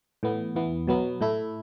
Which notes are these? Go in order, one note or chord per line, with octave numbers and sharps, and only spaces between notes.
A2 E3 B3
E2 E3 B3
B2 F#3 B3
A2 A3 E4